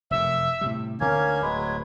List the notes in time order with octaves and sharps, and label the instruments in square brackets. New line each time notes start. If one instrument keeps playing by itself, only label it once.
[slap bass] F1 F#2 C3 [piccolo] E5
[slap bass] A2 C3 G3
[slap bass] D2 D3 C4 [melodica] A#3 C#4 [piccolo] G#6
[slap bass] D1 [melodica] F#3 G#3 B4